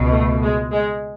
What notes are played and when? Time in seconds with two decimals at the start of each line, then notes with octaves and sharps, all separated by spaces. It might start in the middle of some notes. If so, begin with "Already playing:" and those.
Already playing: C#2 B2
0.11 A3
0.42 G#3
0.72 G#3